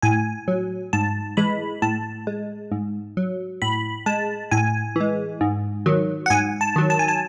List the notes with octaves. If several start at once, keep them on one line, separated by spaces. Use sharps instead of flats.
A2 G#5
F#3
G#2 A5
E3 G#3 B5
A2 A5
G#3
G#2
F#3
A2 B5
G#3 A5
A2 G#5
E3 G#3
G#2
D#3 F#3
F#5
G#2 G#5
A5
D#3 F#3
A5
G#5
A5